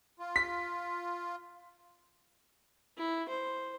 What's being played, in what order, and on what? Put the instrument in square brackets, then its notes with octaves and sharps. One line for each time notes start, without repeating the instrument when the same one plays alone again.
[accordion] F4
[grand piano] B6
[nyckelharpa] E4
C5